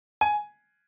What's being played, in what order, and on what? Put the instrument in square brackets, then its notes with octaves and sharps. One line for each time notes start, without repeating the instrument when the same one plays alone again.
[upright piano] G#5